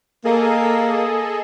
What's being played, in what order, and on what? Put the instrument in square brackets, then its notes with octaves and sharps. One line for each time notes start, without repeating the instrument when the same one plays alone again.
[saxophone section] A#3 [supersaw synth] G#4 A4 D#5